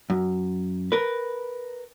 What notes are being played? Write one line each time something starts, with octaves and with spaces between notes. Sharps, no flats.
F#2
A#4 B4